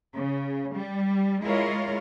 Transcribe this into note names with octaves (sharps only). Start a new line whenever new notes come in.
C#3
G3
G#3 E4 F4 A#4 C#5 F5